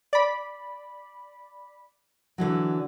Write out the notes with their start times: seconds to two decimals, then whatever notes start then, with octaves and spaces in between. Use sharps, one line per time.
0.13 D5 B5
2.38 D3 E3 F#3